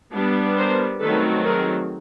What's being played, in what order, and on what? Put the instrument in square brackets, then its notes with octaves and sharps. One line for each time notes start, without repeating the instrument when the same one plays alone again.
[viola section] G3 B3 D4
A#4 C5
D#3 F#3 A3 C4 A4 B4
G#4 A#4